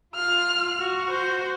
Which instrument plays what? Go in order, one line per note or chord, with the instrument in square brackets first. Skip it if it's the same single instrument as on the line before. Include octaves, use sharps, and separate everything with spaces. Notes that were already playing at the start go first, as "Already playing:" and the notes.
[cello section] F4 [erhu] F6
[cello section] F#4
[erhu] C5